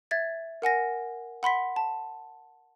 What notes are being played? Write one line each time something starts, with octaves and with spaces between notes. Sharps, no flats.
E5 G#6 A6
A#4 F#5 G#5 A#6
F#5 B5 C6 B6
A5